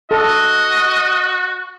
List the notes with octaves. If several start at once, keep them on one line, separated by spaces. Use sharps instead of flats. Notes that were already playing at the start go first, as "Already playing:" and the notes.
F#4 A4 D#5